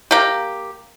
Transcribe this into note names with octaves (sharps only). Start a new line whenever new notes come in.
A#3 G4